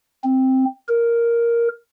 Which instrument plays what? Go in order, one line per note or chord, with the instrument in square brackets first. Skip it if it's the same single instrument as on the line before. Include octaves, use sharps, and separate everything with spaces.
[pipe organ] C4
A#4